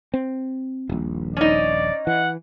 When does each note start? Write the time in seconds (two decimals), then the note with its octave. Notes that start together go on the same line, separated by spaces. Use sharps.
0.14 C4
0.89 D#1 A#1
1.37 C#4 D#4 D5
2.07 E3 F#5